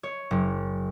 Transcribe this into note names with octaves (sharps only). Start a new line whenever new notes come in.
C#5
F#1